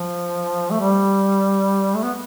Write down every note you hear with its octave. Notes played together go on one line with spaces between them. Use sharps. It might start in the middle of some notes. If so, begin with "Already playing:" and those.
Already playing: F3
A3
G3
A3
B3